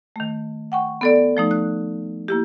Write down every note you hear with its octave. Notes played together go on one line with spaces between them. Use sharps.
D#3 A3
F#5 G5 C#6
B3 A4 D5
F3 A3 D#4
F#6
A#3 E4 G4